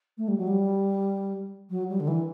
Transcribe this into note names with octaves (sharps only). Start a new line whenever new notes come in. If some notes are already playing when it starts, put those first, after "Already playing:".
A3
G3
F#3
G3
F#3
G3
D3
E3